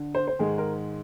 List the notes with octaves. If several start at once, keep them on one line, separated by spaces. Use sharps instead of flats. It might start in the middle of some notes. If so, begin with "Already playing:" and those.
Already playing: D3
C5
C5
G#2 D#3 G#3 G#4
A#4